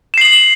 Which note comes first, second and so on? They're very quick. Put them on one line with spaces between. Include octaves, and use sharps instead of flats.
E7 C7 F#7